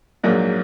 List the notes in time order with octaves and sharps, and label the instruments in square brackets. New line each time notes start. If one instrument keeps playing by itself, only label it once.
[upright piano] A#1 G#2 F#3 A#3